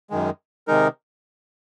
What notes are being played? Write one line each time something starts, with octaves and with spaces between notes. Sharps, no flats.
F#2 D#3 G#3
C3 D#3 G#3 D#4 A#4